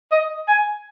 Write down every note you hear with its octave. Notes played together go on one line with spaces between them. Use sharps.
D#5
G#5